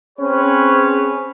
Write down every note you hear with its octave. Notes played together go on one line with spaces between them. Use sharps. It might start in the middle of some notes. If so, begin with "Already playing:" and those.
C4 C#4 G#4 B4 C#5